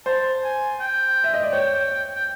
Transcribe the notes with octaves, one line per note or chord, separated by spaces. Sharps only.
C5 A5
G#5
G5
E5
D#5
D5
C#5 G5
G5